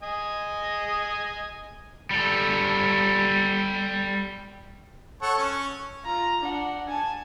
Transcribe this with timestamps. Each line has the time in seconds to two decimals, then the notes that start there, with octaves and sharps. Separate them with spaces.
0.03 D#5 G#5
2.11 G3 A4
5.22 A4 C#5 F#5
5.38 C#4 C#5
6.05 F4 A#5
6.41 D4 F#5
6.87 G#5 A5